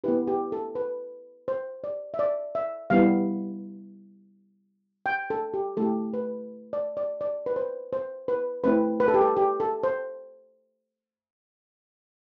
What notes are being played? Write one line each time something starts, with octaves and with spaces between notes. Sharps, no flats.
B3 E4 G4 B4
G4
A4
B4
C5
D5
E5
D5
E5
G3 B3 E4 F5
G5
A4
G4
A3 E4 G4 A4
B4
D5
D5
D5
B4
C5
C5
B4
A3 C4 E4 B4
B4
A4
G4
A4
G4
A4
C5